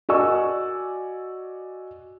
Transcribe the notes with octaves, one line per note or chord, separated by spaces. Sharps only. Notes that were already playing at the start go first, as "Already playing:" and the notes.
F#4 D5 D#5 G#5 C#6 E6